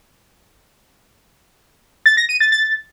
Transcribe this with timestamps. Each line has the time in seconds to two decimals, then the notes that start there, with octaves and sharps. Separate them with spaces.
2.06 A6
2.17 A#6
2.29 D#7
2.40 A6
2.52 A6